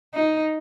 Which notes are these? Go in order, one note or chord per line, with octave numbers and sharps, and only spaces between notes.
D#4